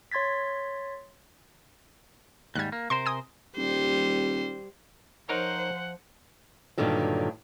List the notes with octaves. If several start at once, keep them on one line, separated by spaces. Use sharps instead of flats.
C#5 C6 G#6 A6 B6
D#2 G#2 G3 F#6 G#6
A#3
C3 A#4 C5 C6
G#5 D#6
D#1 G3 C5
F3 D#4 A#4 C5 C#5 F#5
G2 A#2 D3 D#3 F#3